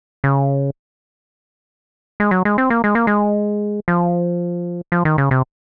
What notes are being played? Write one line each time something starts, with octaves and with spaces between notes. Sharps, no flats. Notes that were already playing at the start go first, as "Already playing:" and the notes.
C#3
G#3
F#3
G#3
C4
A#3
G#3
A#3
G#3
F3
F3
D#3
C#3
C3